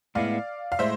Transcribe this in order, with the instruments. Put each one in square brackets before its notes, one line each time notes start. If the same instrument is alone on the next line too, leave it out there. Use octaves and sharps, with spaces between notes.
[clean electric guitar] A2 G#3 B3 E4 [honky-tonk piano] D5 F5
[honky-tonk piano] F5
[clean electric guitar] A2 G#3 [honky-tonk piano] C5 E5